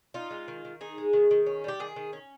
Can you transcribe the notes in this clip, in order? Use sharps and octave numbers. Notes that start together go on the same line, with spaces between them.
D#4 F4
G#3
D#3
D#3
D#4 G#4
G#3
D#3
D#3
C#4
G3 G4
D#3 G#4
D#3
C#4